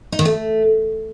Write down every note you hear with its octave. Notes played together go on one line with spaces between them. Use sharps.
D#4
D#3
A3